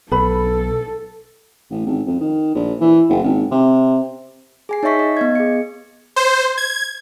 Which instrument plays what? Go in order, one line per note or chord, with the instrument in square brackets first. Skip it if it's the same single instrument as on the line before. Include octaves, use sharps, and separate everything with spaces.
[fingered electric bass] B1 [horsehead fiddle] A4 [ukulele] B4 B5
[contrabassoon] A1
G#1
F2
D#3
A#1
E3
F#1
G#1
C3
[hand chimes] G#4 G#5 C7
D#4 C#5 D#5 E5 C#6 B6
D#5
B3 D#5 G#6
G#4 C#7
[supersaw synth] C5
G#6